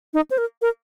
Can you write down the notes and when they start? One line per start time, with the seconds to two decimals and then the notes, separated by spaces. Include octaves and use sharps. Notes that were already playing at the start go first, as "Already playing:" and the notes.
0.14 D#4
0.31 C5
0.38 A#4
0.62 A#4